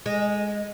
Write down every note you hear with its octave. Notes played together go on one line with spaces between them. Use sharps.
G#3